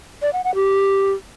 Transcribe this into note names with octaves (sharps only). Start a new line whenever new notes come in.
D5
F#5
F#5
G4